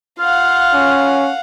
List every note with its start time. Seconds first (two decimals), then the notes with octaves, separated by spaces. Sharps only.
0.19 F4 F5 F#5
0.74 C#4